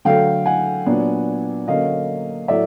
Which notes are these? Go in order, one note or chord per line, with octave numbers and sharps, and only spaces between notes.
D3 F#3 A3 F5 G5
F#5 G#5
A#2 F#3 B3 D4
D3 F#3 A#3 C#4 D#5 F5
A2 F#3 A3 D5 E5